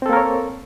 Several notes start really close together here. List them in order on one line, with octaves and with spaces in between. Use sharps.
C4 A4 A#3 A#4 C#5